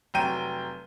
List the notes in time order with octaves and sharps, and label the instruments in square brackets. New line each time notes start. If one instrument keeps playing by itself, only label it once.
[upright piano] F1 F#3 G5 D#7